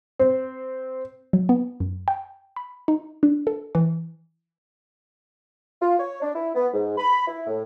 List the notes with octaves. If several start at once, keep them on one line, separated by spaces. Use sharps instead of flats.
C4
F#3
B3
F#2
G5
B5
D#4
D4
A4
E3
F4
C#5
D4
E4
B3
G#2
B5
E4
A2